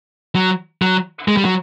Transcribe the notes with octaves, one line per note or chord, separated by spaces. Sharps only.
F#3
F#3
G#3
G3
F#3